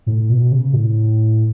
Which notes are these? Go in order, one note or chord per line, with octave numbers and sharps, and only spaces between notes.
A2
B2
C#3
A2